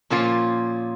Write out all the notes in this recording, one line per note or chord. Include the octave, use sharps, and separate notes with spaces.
A#2 F3 A#3 C#4 F4